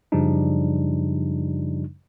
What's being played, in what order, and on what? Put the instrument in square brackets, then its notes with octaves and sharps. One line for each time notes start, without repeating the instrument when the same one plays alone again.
[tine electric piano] F#2 C#3 F3 G3 D4 D#4